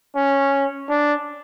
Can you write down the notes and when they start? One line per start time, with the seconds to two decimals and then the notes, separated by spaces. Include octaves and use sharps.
0.16 C#4
0.89 D4